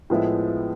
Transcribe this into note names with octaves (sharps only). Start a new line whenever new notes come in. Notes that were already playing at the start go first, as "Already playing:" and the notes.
A2 F3 G#3 B3 E4